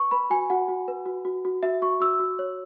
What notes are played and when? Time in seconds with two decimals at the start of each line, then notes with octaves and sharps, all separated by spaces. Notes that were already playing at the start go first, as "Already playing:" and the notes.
Already playing: B4 C#6
0.11 B4 B5
0.30 F#4 G#5
0.50 F#4 F#5
0.68 F#4
0.88 B4
1.06 F#4
1.25 F#4
1.45 F#4
1.63 F#4 E5
1.82 F#4 C#6
2.00 F#4 E6
2.19 F#4
2.39 C#5